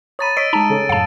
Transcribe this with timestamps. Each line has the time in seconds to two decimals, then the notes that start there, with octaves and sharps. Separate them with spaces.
0.19 C#5 A#5 B5 D#6 A6 D#7
0.37 C#5 D#5 E6 B6 D7
0.53 G#3 D#4 A5 A#5
0.70 C#3 A4 C#5
0.89 F#2 A2 F5 A5